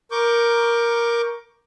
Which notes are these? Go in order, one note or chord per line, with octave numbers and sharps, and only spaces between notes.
A#4 C#6 D6 G6